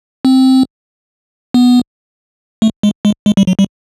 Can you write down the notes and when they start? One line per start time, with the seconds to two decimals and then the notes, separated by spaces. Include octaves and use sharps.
0.25 C4
1.54 B3
2.62 A3
2.83 G#3
3.05 G#3
3.26 G#3
3.37 G3
3.47 F#3
3.59 G3